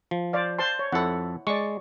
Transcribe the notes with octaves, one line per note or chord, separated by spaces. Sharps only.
F3
C5 D5 F5
C5 A5 C6
C#5
F2 E4 A4 F#5
G#3 D5 C#6